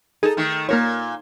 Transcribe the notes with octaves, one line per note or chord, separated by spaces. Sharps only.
D#4 G#4 A4
D#3 A3
A#2 A#3 A#4 C#5